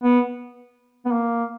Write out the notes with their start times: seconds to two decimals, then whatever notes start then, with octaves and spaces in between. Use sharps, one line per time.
0.04 B3
1.06 B3
1.12 A#3